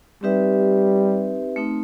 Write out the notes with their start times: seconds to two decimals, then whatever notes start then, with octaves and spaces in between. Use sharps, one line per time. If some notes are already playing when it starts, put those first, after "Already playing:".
0.23 G3 C4 D#4 G4 B4 E5
1.56 A3 C4 D#4